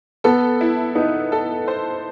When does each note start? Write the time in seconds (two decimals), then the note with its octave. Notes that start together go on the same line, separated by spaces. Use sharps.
0.24 B3 A4
0.61 E4
0.95 B3 D#4
1.32 A4
1.68 C5